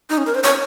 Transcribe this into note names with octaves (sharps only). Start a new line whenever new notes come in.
D#4
C#4
A#4
C5
C#5